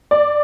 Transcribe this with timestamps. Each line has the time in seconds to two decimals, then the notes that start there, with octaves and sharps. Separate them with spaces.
0.11 D5